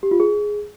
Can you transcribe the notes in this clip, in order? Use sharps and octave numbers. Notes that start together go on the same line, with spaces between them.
G4
F4
G#4